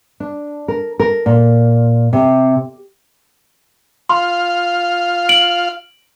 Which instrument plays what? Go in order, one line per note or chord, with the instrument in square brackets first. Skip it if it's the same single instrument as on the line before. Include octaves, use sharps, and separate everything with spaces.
[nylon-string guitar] D4
A#4
A#4
A#2
C3
[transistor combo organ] F4 F5 [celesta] C6
[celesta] D7 F#7